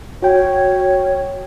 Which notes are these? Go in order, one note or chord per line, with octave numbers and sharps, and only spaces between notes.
F#4 C#5 G5